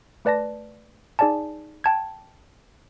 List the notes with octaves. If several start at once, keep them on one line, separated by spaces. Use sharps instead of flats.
A3 B4 D5 A5 A#6
D#4 G#4 D5 G#5 A5
G5 A5 G#6